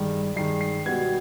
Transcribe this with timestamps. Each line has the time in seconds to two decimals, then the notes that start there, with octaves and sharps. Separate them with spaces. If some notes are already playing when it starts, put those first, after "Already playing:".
Already playing: G2 D#3 G#3
0.36 G2 D#3 G#3 C7
0.61 C7
0.86 B2 G3 B3 G#6